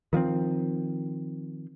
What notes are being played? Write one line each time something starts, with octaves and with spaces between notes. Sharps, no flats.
D#3 F3 B3 C4